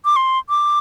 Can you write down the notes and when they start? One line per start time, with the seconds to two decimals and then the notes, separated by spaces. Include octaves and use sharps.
0.05 D6
0.16 C6
0.49 D6